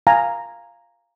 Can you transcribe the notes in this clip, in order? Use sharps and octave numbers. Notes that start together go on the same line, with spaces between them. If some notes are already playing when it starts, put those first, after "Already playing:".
F5 G#5 A#5